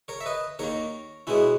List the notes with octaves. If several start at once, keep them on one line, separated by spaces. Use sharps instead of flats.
A#4 C#5
E5
B4 D#5
D#2 D#3 A#3 A#4 C#5
B2 G#3 B3 C#4 E4